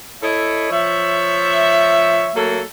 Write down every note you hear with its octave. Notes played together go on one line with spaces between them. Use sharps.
E4 A4 C#5 D#5 E5
F3 C#5 E5
F#3 A3 A#3 A4